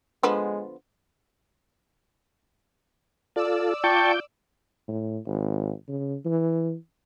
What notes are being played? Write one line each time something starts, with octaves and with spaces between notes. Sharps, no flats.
D3 F3 G#3 B3
F4 A4 D5 E6
F4 G5 A5 C#6 D6 G6
A2
G#1
C#3
E3